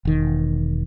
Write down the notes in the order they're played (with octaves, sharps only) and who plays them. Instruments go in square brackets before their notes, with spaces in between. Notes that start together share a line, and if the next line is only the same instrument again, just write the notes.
[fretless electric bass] E1 D#3